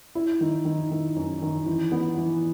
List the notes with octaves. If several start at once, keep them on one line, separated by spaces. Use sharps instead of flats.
E4
D#3
D#3
D#3
F#2
D#3
E3
B3
E3